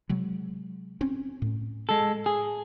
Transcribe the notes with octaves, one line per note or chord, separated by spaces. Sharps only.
C3 F#3 G#3
C4 C#4
A2
G#3 A4
G#4